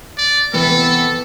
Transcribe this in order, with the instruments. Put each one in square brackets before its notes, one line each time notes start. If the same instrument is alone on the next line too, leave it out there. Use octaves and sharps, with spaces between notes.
[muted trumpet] D5
[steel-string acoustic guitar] C3 E3 B3 [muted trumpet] A4